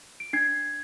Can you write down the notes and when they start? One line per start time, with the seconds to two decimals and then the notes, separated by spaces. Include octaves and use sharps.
0.20 D7
0.33 D4 G#6 C7